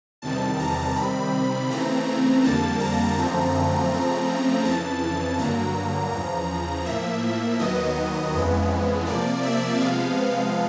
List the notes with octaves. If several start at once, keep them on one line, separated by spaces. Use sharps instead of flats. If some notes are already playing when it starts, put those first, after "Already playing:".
E2 C3 D#3 G3 A5
A#5
C3 D#3 G3 C4 B5
C#3 E3 A3 C4 A#5
F2 D3 G3 A#3 A5
A#5
F#2 D3 F3 A3 C4 A#5
C#3 F3 A3 C4
F2 C#3 E3 A5
G2 D3 F#3 A#3 A#5
E2 C#3 F3 A#5
A2 F3 A#3 E5
D#2 D#3 F#3 B3 D#5
F2 C#3 E3 G#3 B3
C3 F3 A#3 D5
E5
C3 F3 G#3 B3 F5